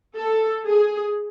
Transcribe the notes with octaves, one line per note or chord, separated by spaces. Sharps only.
A4
G#4